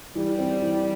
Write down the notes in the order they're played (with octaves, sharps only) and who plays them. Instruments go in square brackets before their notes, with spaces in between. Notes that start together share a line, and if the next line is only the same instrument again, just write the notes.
[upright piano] E3 [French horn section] G3
[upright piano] C4
E3